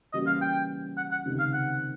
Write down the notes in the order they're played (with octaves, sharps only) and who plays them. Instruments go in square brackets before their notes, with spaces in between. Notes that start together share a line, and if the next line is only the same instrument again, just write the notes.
[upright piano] E3 G3 A#3 C#4 F#4 [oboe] D#5
[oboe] F5
G5
F#5
F#5
[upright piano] C#2 C3 D#3
[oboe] F5
F#5